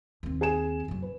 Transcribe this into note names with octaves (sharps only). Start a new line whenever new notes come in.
D#2 C4
G#4 G#5 E7
F#2 F#3
B4